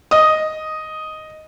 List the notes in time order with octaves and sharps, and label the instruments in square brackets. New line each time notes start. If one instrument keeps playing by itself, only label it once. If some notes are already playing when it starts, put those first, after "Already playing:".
[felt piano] D#5 D#6